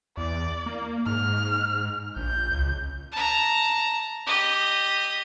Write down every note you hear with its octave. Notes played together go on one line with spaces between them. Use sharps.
E2 D5
A#3
G#2 F6
A#1 G6
C#2
A5 A#5
G4 D#5